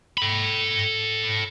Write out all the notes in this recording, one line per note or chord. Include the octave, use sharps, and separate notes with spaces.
A4 B5